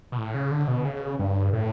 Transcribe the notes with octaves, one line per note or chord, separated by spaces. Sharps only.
B2
A2
C#3
D3
B2
C#3
G2
A2